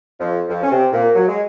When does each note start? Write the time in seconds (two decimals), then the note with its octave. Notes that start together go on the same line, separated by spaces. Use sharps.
0.19 F2 F3
0.48 F2 F3
0.63 C#4
0.71 C3 C4
0.92 A#2 A#3
1.15 F#3
1.28 G#3